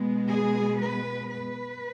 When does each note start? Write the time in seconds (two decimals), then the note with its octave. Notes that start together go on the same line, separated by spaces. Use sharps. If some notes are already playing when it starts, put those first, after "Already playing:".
Already playing: B2 G#3 B3
0.29 G#4
0.79 B4
1.31 B4